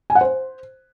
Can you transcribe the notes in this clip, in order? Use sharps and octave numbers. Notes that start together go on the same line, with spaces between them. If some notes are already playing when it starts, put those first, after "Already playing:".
G#5
F#5
C5